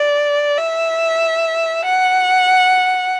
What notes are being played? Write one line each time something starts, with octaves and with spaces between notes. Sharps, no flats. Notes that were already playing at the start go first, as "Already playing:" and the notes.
Already playing: D5
E5
F#5